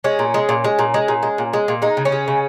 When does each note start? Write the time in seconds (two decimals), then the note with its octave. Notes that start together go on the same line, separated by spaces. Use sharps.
0.04 G#3 C#4
0.19 A#2
0.34 G#3
0.49 A#2
0.64 G#3
0.79 A#2
0.94 G#3
1.08 A#2
1.23 G#3
1.38 A#2
1.53 G#3
1.68 A#2
1.82 G#3 D#4
1.97 C#3
2.05 C#4
2.12 G#3
2.28 C#3